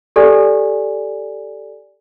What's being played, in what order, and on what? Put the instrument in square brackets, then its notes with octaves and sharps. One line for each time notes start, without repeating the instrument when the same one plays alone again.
[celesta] G4 A4 D5 G#5